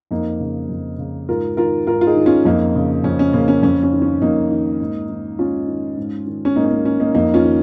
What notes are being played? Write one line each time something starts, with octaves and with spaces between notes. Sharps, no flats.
F2 A#3 D#4
C#3
F2
C#3
G#2 F4 A#4
D#3 F4 A#4
G#2 F4 A#4
F4
D#4 G#4
D#3
C#4 F4
F2 A#3 D#4
C#3
F2 C#4
C#4
C#3 A#3
C#4
F2 C#4
C#4
D#3
C#4
F2 A#3 D#4
D#3
G#2
D#3
G#2 C#4 F4
D#3
G#2
D#3
C#4
G#2 A#3 D#4
C#4
A#3
D#3 C#4
A#3 D#4
F2 A#3 D#4
C#4 F4
D#3